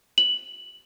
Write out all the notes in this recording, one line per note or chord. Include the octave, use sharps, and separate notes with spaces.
F#7